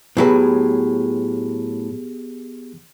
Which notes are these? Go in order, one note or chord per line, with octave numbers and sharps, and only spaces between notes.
A2 F#3 B3 G4 G#4 B4